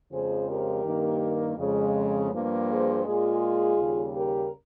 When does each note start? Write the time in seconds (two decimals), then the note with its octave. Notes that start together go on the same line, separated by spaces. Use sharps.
0.11 F2 C#3 F3 G#3 G#4 C5
0.47 G4 A#4
0.84 G2 D#3 A#3
1.58 F2 C#3 G#3
2.32 G2 F3 A#3
2.68 G#4 C5
3.04 A#2 G#3 F4 G#4
3.78 D#2 C#3 G3
4.15 G4 A#4